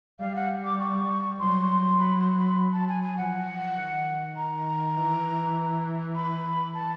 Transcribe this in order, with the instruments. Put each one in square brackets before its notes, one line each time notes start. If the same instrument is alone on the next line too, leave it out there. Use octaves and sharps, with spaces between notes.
[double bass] G3 [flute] F5
[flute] F#5
D6
C#6
[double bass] F#3 [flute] C6
[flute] B5
C6
B5
A5
G#5
G#5
[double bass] F3 [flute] F#5
[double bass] F3
D#3
[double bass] D#3 [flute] A#5
[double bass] E3
[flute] B5
A5